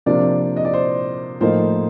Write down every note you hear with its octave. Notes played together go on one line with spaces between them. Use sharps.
C3 F3 A#3 D4 D5
D#5
D5
C5
A2 F3 A#3 D#4 C5